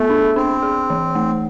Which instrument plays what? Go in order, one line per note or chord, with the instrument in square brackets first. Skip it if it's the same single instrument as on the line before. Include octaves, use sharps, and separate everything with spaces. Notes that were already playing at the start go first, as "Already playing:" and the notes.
Already playing: [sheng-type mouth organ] A3 [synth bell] B3
[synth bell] D4
[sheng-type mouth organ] C4 [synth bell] D4
[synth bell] G#4
E3
A3